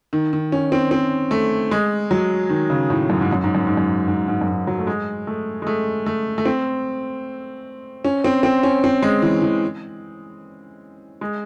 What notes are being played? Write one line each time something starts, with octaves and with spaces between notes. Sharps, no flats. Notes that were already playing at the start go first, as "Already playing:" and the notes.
D#3
D#3
C#4
C4
C4
A3
G#3
F#3
D#3
C#3
A2
F#2
G#2
F#2
G#2
F#2
G#2
F#2
G#2
G#2
F#2
G#2
F#3
A3
G#3
A3
G#3
A3
A3
A3
C4
C#4
C4
C4
C#4
C4
G#3
E3
E3
G#3